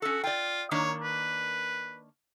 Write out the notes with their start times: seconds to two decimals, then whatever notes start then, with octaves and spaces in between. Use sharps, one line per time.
0.02 C#4 F#4 A4
0.24 F4 D5 G5
0.71 D#3 A#3 D4 C#5
1.03 B4